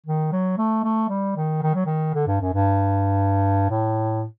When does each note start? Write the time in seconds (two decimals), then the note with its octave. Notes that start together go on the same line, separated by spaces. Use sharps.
0.06 D#3
0.32 F#3
0.58 A3
0.84 A3
1.09 G3
1.36 D#3
1.62 D#3
1.74 F#3
1.86 D#3
2.14 D3
2.27 G2
2.41 F#2
2.53 G2
3.70 A2